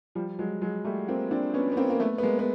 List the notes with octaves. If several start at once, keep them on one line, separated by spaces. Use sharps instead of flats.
F3 G3
F#3 G#3
F#3 G#3
G3 A3
A#3 C4
C4 D4
B3 C#4
B3
A#3 C4
A#3
A3 B3
B3
G#3 A#3
B3